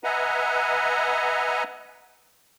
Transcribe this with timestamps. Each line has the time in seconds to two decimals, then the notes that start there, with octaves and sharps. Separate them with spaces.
0.04 B4 D#5 E5 F#5 G#5 A#5